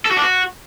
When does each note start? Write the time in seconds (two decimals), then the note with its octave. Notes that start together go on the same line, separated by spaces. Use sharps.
0.05 A4
0.11 F#4
0.17 D4
0.22 F#4